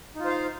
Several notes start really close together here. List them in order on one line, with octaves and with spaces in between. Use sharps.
D#4 F4 C5 F5